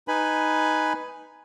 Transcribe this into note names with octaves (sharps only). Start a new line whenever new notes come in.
D#4 B4 G#5 B5